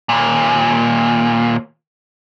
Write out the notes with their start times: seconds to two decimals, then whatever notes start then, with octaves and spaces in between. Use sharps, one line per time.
0.09 D#2 A#2